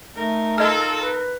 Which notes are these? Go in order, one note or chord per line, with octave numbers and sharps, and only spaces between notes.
A3 D#4 A#4
F4 A4 D#5 F6
B4